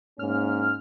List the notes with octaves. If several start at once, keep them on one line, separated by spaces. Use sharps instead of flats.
G#2 A#3 C#4 F6